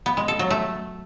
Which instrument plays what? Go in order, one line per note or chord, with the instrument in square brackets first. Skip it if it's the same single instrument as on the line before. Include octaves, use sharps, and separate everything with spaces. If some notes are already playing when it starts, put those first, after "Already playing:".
[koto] B3
G#3
A4
F#3
A3